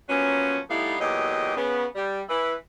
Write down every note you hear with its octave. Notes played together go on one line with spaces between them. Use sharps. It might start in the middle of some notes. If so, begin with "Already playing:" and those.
F3 F#3 A#3 B3 C#4
G3 A3 B3 D#4 E4 F5
E2 A#2 F#3 G4 D#5
C#3 B3
G3
E3 E4 B4